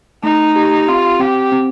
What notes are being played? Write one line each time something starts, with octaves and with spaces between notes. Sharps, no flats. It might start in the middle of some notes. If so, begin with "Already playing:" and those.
A3 D#4
G4
C4 F4
C4 G4
C4